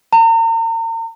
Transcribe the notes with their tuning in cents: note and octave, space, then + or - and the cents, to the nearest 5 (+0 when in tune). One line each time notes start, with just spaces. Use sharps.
A#5 -40